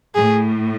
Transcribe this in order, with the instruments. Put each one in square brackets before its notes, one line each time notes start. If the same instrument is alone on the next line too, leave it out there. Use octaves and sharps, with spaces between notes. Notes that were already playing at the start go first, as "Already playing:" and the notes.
[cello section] A2 [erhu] G#4